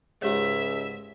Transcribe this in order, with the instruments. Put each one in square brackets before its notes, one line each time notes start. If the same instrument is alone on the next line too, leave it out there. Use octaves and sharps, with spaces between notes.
[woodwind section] C#2 C#3 [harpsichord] G#2 A3 G#4 [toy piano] G4 C#5 [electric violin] E5